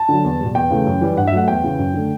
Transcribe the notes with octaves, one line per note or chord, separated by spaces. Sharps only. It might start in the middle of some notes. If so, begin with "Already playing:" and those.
Already playing: A5
D3 F#3
E2
B2 G3
E2 G5
C#3 E3 A3
F#2
E3 G3
G2 F#5
E5
F#3 A3 F#5
E2 G5
C#3 E3
F#2
D3 A3